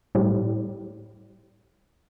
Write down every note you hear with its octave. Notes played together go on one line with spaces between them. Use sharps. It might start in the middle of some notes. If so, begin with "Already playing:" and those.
A2 G3